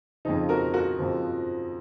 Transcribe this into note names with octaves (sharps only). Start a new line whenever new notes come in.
F2 C#3 F3 D#4
F#4 A#4
F#4 A#4
F2 C#3 F3